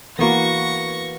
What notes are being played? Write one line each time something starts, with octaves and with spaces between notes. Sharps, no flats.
E3 A#3 B3 F#4 C#6 A#6